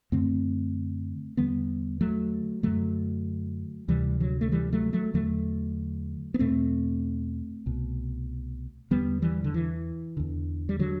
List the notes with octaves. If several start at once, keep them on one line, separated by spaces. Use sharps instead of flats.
F#2 D3 A3 C4
E2 D3 G3 B3
F#3 A3
F#2 D3 F#3 A3
D2 C3 E3 G3
D3 F#3
A3
E3 G3
F#3 A3
F#3 A3
E2 D3 F#3 A3
B3
E2 B2 A3 C4
C2 B2
E2 D3 G3 B3
E3 G3
D3
E3
E2 D3
G3
D3 F#3